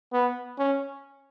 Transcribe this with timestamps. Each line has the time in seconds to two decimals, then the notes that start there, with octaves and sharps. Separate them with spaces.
0.13 B3
0.59 C#4